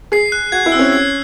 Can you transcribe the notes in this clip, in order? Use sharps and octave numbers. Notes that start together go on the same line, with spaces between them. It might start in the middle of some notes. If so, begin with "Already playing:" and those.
G#4 C7
F#6
F#4 G#6
E4
C4 E6
C#4
C7